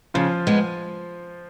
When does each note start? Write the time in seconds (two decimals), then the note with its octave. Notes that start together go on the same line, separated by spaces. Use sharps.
0.14 C#3 F3 F4
0.47 G#3 B3